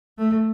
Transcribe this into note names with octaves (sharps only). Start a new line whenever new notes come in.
A3